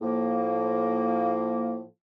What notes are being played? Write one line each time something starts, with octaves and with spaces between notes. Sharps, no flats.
A2 F3 A#3